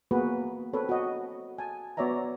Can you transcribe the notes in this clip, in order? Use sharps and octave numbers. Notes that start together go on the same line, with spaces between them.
A#3 B3 F#4 G#4 B4
C4 A4 B4 C#5
F#4 D#5
G#5 A5
B3 F#4 C#5 D5 E5 A#5